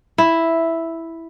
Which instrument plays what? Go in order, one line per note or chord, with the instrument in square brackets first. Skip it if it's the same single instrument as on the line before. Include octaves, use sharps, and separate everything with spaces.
[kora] E4